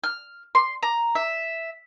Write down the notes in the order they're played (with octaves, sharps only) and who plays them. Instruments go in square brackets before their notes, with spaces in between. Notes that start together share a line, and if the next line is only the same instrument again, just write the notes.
[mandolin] F6
C6
A#5
E5